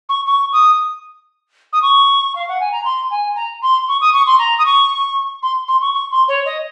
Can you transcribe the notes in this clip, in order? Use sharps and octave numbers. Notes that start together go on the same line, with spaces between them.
C#6
C#6
D#6
D#6
C#6
F5
F#5
G#5
A#5
C6
G#5
A#5
C6
C#6
D#6
C#6
C6
A#5
D#6
C#6
C6
C6
C#6
C#6
C6
C#5
D#5